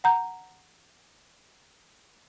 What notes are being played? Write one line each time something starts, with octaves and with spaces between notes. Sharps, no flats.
F#5 A#5 G6